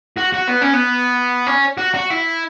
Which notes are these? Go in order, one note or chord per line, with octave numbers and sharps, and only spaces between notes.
F#4
F#4
B3
C#4
B3
C#4
F#4
F#4
E4